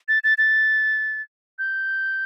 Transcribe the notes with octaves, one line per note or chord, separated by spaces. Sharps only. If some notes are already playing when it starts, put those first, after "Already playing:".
A6
A6
A6
G6